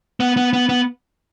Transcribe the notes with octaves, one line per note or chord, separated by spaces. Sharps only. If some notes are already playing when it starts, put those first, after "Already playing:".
B3
B3
B3
B3